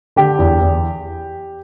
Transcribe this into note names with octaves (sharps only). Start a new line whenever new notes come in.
D3 G4
E2
E2